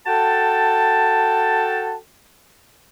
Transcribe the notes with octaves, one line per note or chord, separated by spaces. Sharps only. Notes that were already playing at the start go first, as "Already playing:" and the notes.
F#4 A4 G5 A5